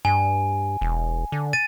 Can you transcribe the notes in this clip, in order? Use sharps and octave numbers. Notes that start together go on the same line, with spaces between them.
G2 G#5
E1
D3
A6 D#7